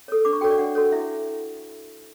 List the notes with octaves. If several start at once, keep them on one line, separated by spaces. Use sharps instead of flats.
A4 C#5
D4 D6
C#6
F#4 A4 C#5 G5
D5
D4 F#5
F#4 A4 C#5
E4 E5